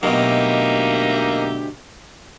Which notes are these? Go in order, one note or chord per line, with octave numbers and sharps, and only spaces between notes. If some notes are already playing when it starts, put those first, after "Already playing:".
D2 B2 F#3 A#3 D#4 G4 D#5 E5